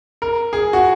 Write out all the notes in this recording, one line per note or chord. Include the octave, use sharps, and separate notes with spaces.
A#4
G#4
F#4